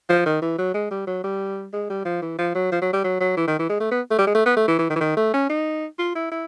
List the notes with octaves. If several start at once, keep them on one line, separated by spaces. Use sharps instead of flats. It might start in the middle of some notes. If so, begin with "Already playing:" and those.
F3
D#3
E3
F#3
G#3
G3
F#3
G3
G#3
G3
F3
E3
F3
F#3
F3
F#3
G3
F#3
F#3
E3
D#3
E3
G#3
A3
B3
A3
G3
G#3
A3
B3
A3
E3
E3
D#3
E3
D#3
A3
C#4
D#4
F4
E4
E4